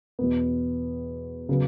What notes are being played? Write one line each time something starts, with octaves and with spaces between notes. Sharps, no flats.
E2 B2 B3
C#3 F#3 B3